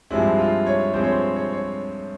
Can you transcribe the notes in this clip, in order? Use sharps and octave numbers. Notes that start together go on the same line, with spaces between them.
G2 F3 G#3 C4 E4
F4
C#5
G2 F3 G#3 C4 C5
C#5
C5
C#5
C5
C#5